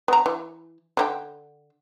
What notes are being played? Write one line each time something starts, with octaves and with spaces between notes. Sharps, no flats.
B3 A#5
E3
D3 E4 G5